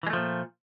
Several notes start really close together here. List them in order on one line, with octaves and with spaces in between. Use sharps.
E3 G#3 A3 F3 A#2